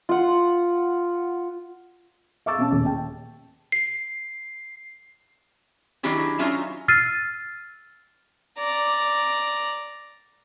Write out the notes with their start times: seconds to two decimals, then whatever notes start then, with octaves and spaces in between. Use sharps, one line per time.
0.09 F4 F#5
2.46 E5 F5 C#6 D6 E6 A6
2.58 B2 C#4 A5
2.72 D#1
2.85 G5 A5
3.72 C7
6.03 D#3 F#3 D4 E4 G4 G#4
6.39 F#3 C#4 D#4 F4 E5
6.88 E6 F6 A6 C7 D#7
8.58 D5 A#5